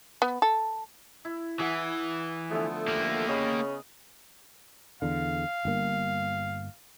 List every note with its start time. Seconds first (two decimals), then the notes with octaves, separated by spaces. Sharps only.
0.22 B3
0.42 A4
1.25 E4
1.60 E3 G#4 E5 F#5
2.51 D3 F3 A3 B3 G#4 E5
2.88 A#3 G4
3.29 C#3 C#4 D#5 B5 D#6
5.02 E2 D3 F5
5.65 G1 G2 A#3